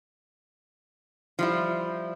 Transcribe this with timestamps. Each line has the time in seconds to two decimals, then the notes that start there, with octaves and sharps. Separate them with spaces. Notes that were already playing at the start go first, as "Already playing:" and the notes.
1.39 F3 G3 E4